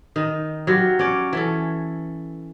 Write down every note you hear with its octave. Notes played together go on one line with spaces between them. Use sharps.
D#3 D#4
F#3 F4 G4
C#4 D5
E3 C#4 A4